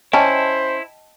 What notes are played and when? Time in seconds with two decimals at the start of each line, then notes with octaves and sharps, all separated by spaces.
0.13 C#4 E4 C5 D#5 G5 A5